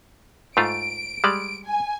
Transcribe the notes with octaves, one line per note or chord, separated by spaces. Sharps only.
G#2 A3 F4 D7
G3 G#3 D5
G#5